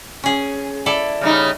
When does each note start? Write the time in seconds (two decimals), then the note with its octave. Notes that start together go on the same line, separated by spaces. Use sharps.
0.24 C#4 G#4
0.86 E4 A4 D5
1.21 C#3 G3 D#4